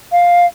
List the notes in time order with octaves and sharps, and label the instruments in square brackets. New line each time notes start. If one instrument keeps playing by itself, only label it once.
[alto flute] F5